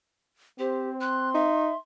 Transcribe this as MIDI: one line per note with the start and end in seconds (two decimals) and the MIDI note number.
0.59 1.52 60
0.59 0.89 67
0.59 0.97 72
1.01 1.77 84
1.01 1.29 90
1.34 1.72 63
1.34 1.75 76